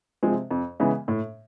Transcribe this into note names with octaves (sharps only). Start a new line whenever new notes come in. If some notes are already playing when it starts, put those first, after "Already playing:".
C3 F3 G#3 C4
F2
C#3 E3 G#3 B3
A2